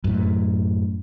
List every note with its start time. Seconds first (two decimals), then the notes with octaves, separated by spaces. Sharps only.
0.04 F#2 A2